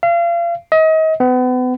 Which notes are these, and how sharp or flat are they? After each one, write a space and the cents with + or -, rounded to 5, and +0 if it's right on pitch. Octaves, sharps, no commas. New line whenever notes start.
F5 -35
D#5 +35
B3 +35